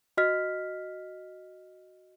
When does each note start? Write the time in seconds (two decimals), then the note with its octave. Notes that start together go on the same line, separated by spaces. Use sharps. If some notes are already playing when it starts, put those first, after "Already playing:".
0.17 F#4 D#5 F6 B6